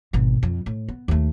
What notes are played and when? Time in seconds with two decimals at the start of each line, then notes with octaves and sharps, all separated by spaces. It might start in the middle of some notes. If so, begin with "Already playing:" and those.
0.13 G#1 B2
0.43 F2
0.66 A2
0.88 B3
1.08 D#2 A3